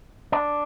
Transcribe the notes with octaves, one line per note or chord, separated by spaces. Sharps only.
D4